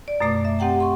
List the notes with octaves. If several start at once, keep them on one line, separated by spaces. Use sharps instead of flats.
D5
F#2 B2 A3 A#5 D6
E5
C4 G4 F#5 G5 A#5
C6 C#6